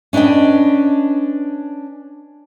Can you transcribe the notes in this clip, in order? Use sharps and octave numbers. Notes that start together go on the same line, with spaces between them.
C#4 D4 B4 D#5 G5